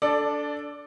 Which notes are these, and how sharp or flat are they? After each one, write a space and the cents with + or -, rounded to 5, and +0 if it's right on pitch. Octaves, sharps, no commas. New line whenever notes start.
D4 -15 A4 +0 D5 +10